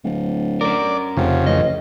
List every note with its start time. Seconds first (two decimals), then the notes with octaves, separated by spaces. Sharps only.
0.04 D1
0.61 C#4 A#4 D5
1.17 F1 F2 C#3
1.47 A1 D#5